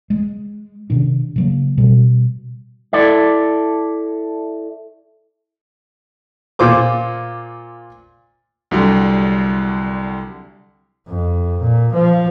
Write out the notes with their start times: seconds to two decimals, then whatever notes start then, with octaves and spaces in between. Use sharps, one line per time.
0.10 G#3
0.90 C3 D#3 D4
1.36 C#3 F#3 A#3
1.78 B2 G3
2.93 E4 A4 D5
6.59 A#2 F4 C5 D6
8.71 C2 D3 F#3 G3
11.09 F2
11.61 A#2
11.93 F3